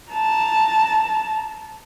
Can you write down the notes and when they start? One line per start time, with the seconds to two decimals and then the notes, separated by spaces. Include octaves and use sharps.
0.12 A5 A#5